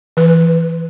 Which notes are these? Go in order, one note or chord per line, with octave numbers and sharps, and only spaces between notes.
E3 B4